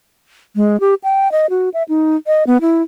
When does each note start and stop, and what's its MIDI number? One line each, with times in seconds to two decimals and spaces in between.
0.56 0.80 56
0.80 0.94 67
1.04 1.31 79
1.32 1.46 75
1.50 1.69 66
1.74 1.83 76
1.89 2.16 63
2.27 2.44 75
2.47 2.57 59
2.61 2.82 64